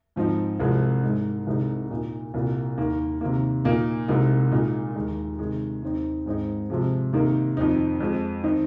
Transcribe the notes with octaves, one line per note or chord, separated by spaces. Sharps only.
G#2 F3 C4 D#4
C2 C3 F3 G#3
G#2 G#3 D#4
C2 C3 G#3 D#4
A#2 A#3 D#4
C2 A#2 A#3
D#2 D#3 A#3
C3 D#3 A#3
A#2 A#3 D#4
C2 C3 G#3 D#4
A#2 G#3 D#4
D#2 D#3 G#3 D#4
C3 D#3 G#3
D#2 D#3 C4 D#4
G#2 G#3 C4 D#4
C3 F3 G#3
C3 D#3 A#3 D#4
F2 D#3 C4 D#4
F2 F3 G#3
D#3 C4 D#4